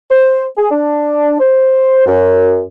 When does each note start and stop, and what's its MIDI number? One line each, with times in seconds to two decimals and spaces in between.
0.10 0.44 72
0.57 0.71 68
0.71 1.40 62
1.40 2.02 72
2.06 2.62 42